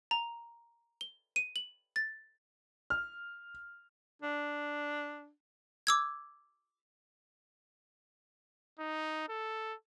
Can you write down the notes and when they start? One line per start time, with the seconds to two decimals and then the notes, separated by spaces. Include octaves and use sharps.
0.11 A#5
1.01 G7
1.36 D#7
1.56 F#7
1.96 A6
2.90 F6
4.22 D4
5.87 D6 E6 G#6
8.79 D#4
9.29 A4